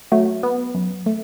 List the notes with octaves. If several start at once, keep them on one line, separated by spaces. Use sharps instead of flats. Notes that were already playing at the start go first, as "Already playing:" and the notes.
F#3 A3
B3
F#2
A3